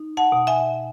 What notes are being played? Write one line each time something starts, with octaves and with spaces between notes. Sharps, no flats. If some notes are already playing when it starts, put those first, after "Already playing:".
Already playing: D#4
F#5 A5
B2
E5 G#5